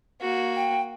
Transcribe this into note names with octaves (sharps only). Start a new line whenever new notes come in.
A#3 F#4
G5